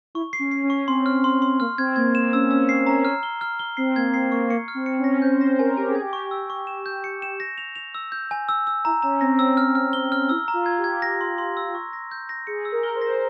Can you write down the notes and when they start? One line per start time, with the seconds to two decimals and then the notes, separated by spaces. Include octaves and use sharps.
0.15 E4 C#6
0.33 C7
0.39 C#4
0.51 C7
0.64 C#4
0.70 C#6
0.88 C4 C6
1.06 F6
1.24 C6
1.42 C6
1.60 A#3 F6
1.78 C4 G#6
1.96 A#3 G#6
2.14 C4 E7
2.33 C#4 E6
2.51 C#4 E6
2.69 C7
2.87 C#4 A#5
3.05 F6
3.23 G7
3.41 F6
3.59 G7
3.77 C4 C7
3.96 A#3 G#6
4.14 C4 C7
4.32 A#3 C#6
4.50 A#3 C#7
4.68 F6
4.75 C4
4.86 C#7
4.99 C#4
5.04 A#6
5.22 C5 G6
5.40 C5 A#6
5.59 A#4 G#5
5.77 G4 G#5
5.89 G#4
5.95 G#6
6.01 G4
6.13 C#6
6.31 E6
6.50 C#6
6.67 E7
6.86 G6
7.04 C#7
7.22 E7
7.40 A#6
7.58 F7
7.76 F7
7.95 E6
8.12 G6
8.31 G#5
8.49 E6
8.67 E6
8.85 E4 A#5
9.02 C#4 A#5
9.21 C4 A#6
9.39 E6
9.57 F6
9.75 F6
9.93 G7
10.12 F6
10.29 E4 E6
10.48 A#5
10.54 F4
10.66 G#6
10.78 G4
10.84 G#6
11.02 A#6
11.21 C6
11.38 C6
11.57 E6
11.75 C#6
11.93 A#6
12.11 G6
12.29 A#6
12.47 G#4 C#7
12.65 E6
12.72 A#4
12.83 G7
12.95 C5
13.02 A#6